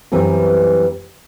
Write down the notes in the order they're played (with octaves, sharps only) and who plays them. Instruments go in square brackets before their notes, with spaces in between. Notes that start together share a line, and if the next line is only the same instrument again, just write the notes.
[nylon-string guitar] F#2 E3 G3 C4 B4